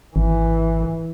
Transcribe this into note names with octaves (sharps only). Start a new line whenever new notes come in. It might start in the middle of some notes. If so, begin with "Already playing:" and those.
G#1 E3